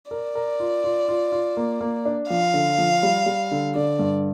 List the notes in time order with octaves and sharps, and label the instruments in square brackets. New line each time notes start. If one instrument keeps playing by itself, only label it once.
[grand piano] A#4 [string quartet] D5
[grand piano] A#4
F4
F4
F4
F4
A#3
A#3
D4
[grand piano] F3 [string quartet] F5
[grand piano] D3
F3
G3
G3
D3
[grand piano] D3 [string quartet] D5
[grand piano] G2